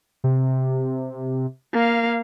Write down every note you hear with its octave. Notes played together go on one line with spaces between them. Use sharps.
C3
A#3 F5